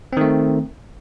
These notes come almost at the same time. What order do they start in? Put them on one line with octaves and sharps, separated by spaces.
C4 D#3 A3